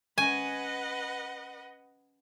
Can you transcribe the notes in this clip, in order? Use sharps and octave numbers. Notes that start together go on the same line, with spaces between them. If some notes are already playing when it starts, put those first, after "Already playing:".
C#4 B4 D#5 F#5 G#5